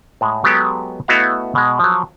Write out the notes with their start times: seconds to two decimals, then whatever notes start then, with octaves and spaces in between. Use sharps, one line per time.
0.21 A2 G#3
0.44 F#3 G#3 B3 G4 A4
1.08 A3 B3 E4 F#4 D#5 F5
1.55 B2 G#3
1.79 F3 F#3